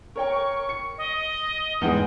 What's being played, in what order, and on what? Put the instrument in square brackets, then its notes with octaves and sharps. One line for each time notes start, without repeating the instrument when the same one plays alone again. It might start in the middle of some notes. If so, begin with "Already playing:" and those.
[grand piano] A#4 C#5 G5 [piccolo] C#6
[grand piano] C#7
[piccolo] D#5
[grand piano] E2 G#2 G#3 [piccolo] G5